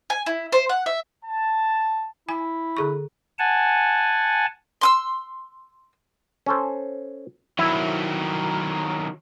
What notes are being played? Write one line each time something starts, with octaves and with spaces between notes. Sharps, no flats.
G#5
E4
C5
F#5
E5
A5
E4 G#5
D3 G#4 C#6
F#5 G#5 A5
C6 D#6 E6
C#4 A4 C5
D#3 F#3 E4